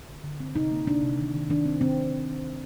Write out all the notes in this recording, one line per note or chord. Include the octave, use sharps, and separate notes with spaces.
D3
D3
C4
C3 D#4
A#3
C3 D4
C3
D#3
D#3
D#3 D4
C4
D#3 C4